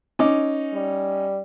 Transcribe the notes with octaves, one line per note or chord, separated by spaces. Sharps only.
C#4 D#4 D6
G3